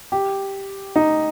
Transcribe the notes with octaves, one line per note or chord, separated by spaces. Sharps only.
G4
D#4